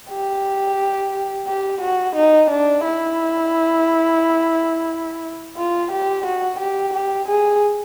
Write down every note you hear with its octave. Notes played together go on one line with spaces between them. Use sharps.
G4
G4
F#4
D#4
D4
E4
F4
G4
F#4
G4
G4
G#4